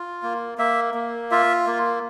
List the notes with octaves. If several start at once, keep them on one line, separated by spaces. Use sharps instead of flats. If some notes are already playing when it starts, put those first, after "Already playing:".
Already playing: F4
A#3
A#3 E5
A#3
F4 E5
A#3